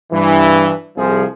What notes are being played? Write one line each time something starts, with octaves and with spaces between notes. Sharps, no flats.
G2 E3
C2 F3 G#4